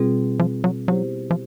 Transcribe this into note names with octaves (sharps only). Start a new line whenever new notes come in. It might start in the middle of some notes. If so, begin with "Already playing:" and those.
Already playing: B2 G3 C4 F4 G#4
F3
F#3
F#3 B3 E4 G4 C5
F3